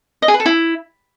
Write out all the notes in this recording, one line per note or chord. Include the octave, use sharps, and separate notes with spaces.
D#5
G#4
B4
A4
E4